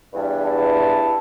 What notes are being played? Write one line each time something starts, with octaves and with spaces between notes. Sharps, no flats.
E2 G2
E4 A5